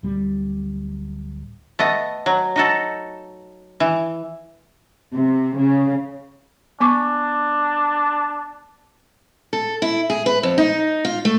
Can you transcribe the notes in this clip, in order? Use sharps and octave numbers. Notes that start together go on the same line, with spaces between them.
D1 G3
A3 B3 D#5
F#3
D#4 F#4 A4
E3
C3
C#3
B3 D4 C#6 D6
A4
E4
G#4
B4
F2
D#4
F4
A3